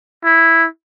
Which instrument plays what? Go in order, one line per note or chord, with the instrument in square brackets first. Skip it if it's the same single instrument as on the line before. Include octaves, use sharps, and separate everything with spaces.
[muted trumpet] E4